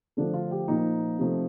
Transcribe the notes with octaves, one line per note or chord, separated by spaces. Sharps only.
D3 F3 A3 D4
F4
G4
A#2 F3 A#3 D#4
C3 F3 A3